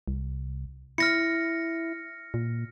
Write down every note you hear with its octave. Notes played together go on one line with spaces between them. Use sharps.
C2
E4 F6 A#6 C#7
A#2